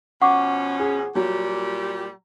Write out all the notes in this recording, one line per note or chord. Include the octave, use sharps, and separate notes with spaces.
B2 F3 C#4 F#5 C#6 D6
G#4
A#2 F#3 G3 G4